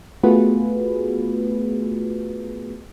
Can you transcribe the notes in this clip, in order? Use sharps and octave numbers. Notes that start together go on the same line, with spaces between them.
A3 B3 F4 F#4 G#4 B4